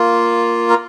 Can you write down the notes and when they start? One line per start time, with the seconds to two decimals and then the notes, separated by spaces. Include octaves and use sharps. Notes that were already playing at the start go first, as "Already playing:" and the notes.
Already playing: A#3 F4
0.70 A#4